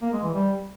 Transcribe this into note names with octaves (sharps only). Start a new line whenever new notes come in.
A#3
G#3
E3
G3